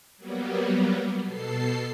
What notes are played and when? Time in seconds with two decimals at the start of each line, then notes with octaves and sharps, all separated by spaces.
0.17 F#3 G3 A#3 B3
1.24 B2 A4 C7